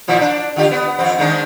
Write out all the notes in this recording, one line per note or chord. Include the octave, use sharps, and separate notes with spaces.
A#2 F3 E4
D4
D3 F4 G4
B3
F2 C4
D#3 G#3 D4